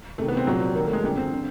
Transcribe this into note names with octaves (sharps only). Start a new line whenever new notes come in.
C2 C3 D#3 A3
B3
C4
C2 A#2 F3 F#3
D#2 D#3 A#3
A3
G#3
F#2 D3 F3 G3
C4
D3